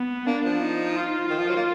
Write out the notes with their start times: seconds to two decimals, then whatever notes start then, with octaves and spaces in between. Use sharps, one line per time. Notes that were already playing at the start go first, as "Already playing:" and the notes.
Already playing: B3
0.27 A#3 D4
0.45 F3
0.62 D#4
0.96 F4
1.30 D#3 F4
1.39 F3
1.48 F#3
1.56 A#3